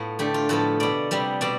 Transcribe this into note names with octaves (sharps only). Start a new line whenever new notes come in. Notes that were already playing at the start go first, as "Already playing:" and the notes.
Already playing: A2 B3 F4
D3 A3 G4
F4
A2 F3 B3 A4
B2 B3 D5
C3 G3 B3
B2 B3 D5